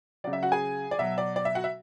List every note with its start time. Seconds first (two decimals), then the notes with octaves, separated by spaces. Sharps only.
0.24 C#3 F#3 D5
0.33 E5
0.43 F#4 F#5
0.52 G#4 G#5
0.91 D5
0.98 B2 F#3 E5
1.18 D5
1.36 D5
1.45 E5
1.55 F#4 F#5
1.64 E5